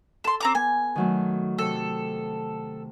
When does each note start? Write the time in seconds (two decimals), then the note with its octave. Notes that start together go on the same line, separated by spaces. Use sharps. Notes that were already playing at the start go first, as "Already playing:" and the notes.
0.24 A4 A5 C6
0.41 C4 A#5 D6
0.55 B3 G#5
0.95 D#3 F#3 A3
1.58 C3 D#3 A4